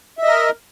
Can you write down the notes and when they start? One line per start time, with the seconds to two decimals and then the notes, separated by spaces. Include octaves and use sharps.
0.18 E5
0.23 D#5
0.27 A#4